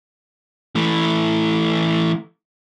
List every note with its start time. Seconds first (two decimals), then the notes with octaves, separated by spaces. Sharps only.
0.76 E3 A3